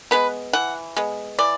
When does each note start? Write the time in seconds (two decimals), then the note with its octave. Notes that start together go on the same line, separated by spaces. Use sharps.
0.11 G#3 B3 B4
0.53 E3 F#5
0.97 G#3 B3
1.39 E3 D5